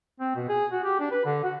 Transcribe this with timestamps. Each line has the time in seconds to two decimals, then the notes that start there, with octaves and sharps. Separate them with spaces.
0.20 C4
0.36 B2
0.49 G#4
0.72 F#4
0.84 G4
1.00 D4
1.12 B4
1.25 D3
1.44 F#4